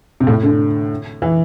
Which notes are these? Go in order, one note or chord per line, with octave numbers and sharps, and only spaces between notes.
C3
A2
D3
E3